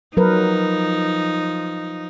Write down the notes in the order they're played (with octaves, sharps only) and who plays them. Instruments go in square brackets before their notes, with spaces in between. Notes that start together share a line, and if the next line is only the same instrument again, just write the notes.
[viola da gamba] F3 D#4 [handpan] F#3 A#4 B4